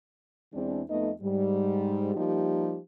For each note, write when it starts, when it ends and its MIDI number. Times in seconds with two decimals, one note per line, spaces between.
0.54 0.82 40
0.54 0.82 52
0.54 0.82 56
0.54 0.82 60
0.54 0.82 62
0.89 1.10 41
0.89 1.10 57
0.89 1.10 59
0.89 1.10 63
0.89 1.10 75
1.21 2.12 44
1.21 2.12 55
2.15 2.77 53
2.15 2.77 55
2.15 2.77 58
2.15 2.77 63
2.15 2.77 67